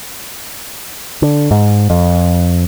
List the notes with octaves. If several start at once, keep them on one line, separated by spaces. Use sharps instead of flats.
D3
G#2
F2